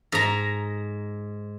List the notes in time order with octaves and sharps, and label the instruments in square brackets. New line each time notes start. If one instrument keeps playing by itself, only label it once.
[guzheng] G#2 A#5